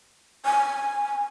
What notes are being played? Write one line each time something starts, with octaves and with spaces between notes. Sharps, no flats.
G#5